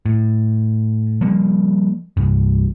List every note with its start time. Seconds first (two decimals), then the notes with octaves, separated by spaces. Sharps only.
0.06 A2
1.21 F3 G3 A#3
2.17 C2 G2